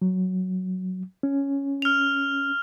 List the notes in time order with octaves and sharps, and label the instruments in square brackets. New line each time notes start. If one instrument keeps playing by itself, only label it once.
[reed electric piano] F#3
C#4
[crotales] F6 F7